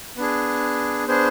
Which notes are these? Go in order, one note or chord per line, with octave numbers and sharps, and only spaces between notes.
B3 D4 G#4
B3 D4 G#4 C5